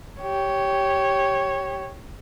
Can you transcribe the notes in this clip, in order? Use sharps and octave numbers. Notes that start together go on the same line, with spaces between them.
G4 C#5